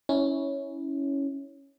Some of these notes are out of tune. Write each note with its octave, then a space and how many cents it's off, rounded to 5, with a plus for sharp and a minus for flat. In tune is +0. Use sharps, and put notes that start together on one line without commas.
C#4 +0 E4 -25